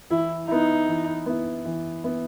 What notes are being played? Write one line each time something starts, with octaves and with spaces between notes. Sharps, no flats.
E3 E4
B3 D#4 E4
E3
B3 E4
E3
B3 E4